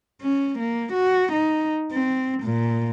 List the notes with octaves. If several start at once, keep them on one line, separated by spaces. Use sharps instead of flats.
C#4
A#3
F#4
D#4
C4
A#2